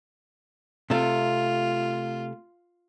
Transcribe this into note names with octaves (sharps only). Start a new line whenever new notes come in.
C3 A3 F4